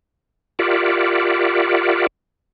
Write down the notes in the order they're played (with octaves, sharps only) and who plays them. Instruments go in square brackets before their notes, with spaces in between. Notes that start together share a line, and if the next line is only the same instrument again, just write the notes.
[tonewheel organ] F4 G4 A#4 D5 E5 F#5